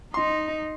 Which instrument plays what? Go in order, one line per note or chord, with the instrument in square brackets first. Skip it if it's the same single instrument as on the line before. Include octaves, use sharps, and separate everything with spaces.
[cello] D#4 [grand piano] C6